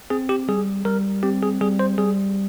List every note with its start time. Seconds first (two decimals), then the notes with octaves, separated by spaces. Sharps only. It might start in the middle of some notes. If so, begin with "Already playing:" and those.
0.10 C4 G#4
0.29 G4
0.49 G3 G#4
0.85 G3 A#4
1.23 C4 G4
1.43 G#4
1.61 G3 G#4
1.79 C5
1.98 G3 G#4